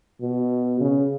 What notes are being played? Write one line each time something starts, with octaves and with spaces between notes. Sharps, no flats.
B2
C#3